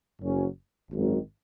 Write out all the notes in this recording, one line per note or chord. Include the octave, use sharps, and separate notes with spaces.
F#1 F#2 F#3 C#4
G#1 F#2 D#3